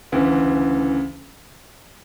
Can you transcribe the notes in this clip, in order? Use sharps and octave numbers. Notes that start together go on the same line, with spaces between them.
D2 C#3 E3